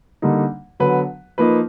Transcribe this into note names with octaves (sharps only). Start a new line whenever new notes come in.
D3 G3 A#3 D#4
D3 F#3 B3 B4
F3 A#3 D#4 B4